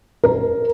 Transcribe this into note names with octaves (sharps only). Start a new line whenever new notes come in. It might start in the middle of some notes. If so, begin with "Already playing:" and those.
A#4